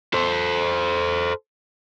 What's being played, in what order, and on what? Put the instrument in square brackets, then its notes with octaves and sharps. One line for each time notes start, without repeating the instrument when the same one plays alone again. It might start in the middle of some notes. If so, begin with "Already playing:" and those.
[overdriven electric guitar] A4 C5